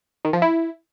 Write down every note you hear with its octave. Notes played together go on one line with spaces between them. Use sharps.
D#3
F3
E4